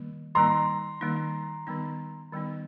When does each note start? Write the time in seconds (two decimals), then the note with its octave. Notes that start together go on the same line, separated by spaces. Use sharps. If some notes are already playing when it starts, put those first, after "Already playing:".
Already playing: D#3 G3 A#3
0.35 D#3 G3 A#3 D#4 A#5 C6
1.01 D#3 G3 A#3 D#4
1.67 D#3 G3 B3 D#4
2.32 D#3 G3 B3 D#4